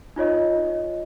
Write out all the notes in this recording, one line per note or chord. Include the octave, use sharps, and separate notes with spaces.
D#4 F4 C#5 D#5